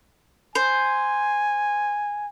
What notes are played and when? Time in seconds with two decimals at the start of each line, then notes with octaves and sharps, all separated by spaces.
0.55 C5 G#5